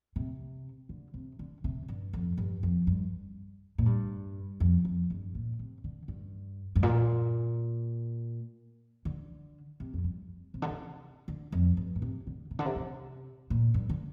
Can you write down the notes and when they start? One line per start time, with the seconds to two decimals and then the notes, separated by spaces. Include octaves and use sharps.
0.16 C3
0.89 D3
1.14 C3
1.39 D3
1.64 C3
1.88 G2
2.13 F2
2.38 G2
2.63 F2
2.87 G2
3.78 A#2
3.86 G2
4.60 F2
4.85 F2
5.10 G2
5.35 A#2
5.59 C3
5.84 D3
6.08 G2
6.75 G2
6.83 A#2
9.05 D3
9.80 C3
9.93 F2
10.04 G2
10.54 C3
10.62 D3
10.70 C3
11.28 D3
11.52 F2
11.77 G2
11.96 A#2
12.02 C3
12.27 D3
12.51 C3
12.59 D3
12.65 C3
12.76 C3
13.50 A#2
13.74 G2
13.89 D3